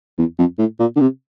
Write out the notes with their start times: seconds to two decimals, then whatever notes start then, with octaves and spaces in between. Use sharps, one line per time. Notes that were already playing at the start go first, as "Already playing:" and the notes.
0.18 E2
0.38 F2
0.59 A2
0.80 A#2
0.96 D3
1.01 C3